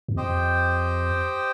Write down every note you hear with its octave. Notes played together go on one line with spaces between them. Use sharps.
E2
F2 G4 C5 D#5 G5